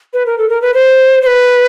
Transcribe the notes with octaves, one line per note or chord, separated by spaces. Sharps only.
B4
A#4
A4
A#4
B4
C5
C5
B4